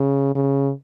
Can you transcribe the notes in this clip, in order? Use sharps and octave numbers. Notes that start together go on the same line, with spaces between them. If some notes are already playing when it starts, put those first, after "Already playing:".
Already playing: C#3
C#3